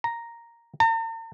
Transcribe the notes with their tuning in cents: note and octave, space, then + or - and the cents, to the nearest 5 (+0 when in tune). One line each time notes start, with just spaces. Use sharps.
A#5 +0
A#5 -45